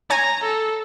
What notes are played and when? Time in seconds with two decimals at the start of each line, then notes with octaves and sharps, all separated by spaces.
0.10 C#5 G#5 A#5
0.43 A4